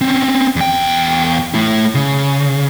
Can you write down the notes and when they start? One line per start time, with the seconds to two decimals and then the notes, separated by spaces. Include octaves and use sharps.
0.01 C4 C#4
0.56 E2 G5
1.54 A3 E4
1.95 C#3